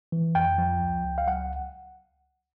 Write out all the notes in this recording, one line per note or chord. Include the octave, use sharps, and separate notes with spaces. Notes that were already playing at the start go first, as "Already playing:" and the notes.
E3
F2 G5
F3
C#2
C#2
F5
F#3 F#5